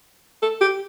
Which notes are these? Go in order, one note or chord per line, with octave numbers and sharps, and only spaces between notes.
A4
G4